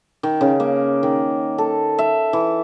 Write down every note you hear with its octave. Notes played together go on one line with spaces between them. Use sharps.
D#3
C#3
A#3
D#3
A4
E5
E3